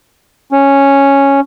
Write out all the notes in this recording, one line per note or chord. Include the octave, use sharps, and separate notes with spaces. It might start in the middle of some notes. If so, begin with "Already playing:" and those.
C#4